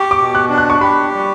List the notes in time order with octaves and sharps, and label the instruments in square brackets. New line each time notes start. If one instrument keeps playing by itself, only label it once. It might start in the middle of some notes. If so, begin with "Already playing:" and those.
Already playing: [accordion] G4 [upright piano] C#6
[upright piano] D6
[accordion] B2
[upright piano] F#6
[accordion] D4
[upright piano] F#6
C#6
[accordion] G4 [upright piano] B5
[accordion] G3